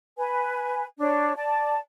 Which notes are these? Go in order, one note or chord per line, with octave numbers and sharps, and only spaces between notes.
B4 G#5
D4 C#5
D5 A5